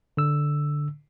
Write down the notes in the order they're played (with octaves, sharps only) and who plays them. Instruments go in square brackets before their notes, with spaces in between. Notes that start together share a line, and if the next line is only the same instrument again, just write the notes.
[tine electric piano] D3 E6